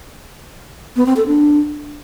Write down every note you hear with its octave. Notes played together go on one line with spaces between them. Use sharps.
B3
C4
A4
D4